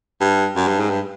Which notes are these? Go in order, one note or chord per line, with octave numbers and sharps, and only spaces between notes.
G2
F#2
G2
G#2
G2